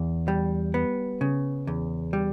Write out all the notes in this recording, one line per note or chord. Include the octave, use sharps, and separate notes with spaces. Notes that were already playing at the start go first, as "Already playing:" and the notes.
Already playing: E2
G3
B3
C#3
E2
G3